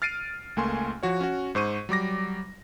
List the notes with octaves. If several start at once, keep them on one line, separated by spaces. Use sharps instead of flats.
F6 A6 C7 D7 D#7
C#2 A3 A#3 G#5 C6
F3 F#4 C#5
C#4 F#4
G#2 C5 C#6 D#7
F#3 G3 D6 A#6